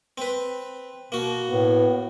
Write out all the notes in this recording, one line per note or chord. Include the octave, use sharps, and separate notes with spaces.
C4 B4
B2 A#3 F#4
A2 B3